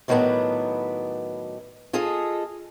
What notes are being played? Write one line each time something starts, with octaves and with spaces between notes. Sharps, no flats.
A2 D#3 F#3 A3 B3 D4
F4 G#4 A4 D#5